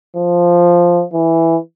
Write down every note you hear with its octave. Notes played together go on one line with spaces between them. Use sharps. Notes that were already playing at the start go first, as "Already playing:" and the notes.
F3
E3